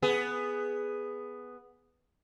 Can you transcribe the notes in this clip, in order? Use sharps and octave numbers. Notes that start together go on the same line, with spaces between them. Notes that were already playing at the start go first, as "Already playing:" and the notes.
B3 G#4